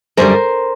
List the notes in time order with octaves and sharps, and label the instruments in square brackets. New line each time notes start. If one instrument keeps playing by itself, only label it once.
[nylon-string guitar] F#2 D3 G3 A#4 C5